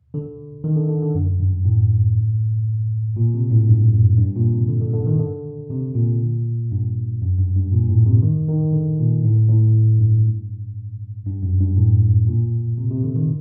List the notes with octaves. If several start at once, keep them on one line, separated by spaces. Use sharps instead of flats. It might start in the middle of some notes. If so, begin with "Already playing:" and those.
D3
D#3
D3
D3
D3
F#2
G2
A2
A#2
C3
A2
G2
F#2
G2
A#2
C3
D3
D3
D3
D#3
D3
C3
A#2
G2
F#2
G2
G2
A#2
A2
C3
D#3
D#3
D3
A#2
A2
A2
G2
G2
F#2
G2
A2
A#2
C3
C3
D3
D#3